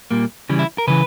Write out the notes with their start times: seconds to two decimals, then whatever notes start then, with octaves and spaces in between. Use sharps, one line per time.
0.11 A#2 G3 A#3
0.49 C#3 E3 G3
0.59 E4
0.78 A#4
0.87 C#3 E3 B4